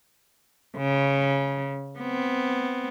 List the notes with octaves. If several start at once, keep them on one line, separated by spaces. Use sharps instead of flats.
C#3
B3 C4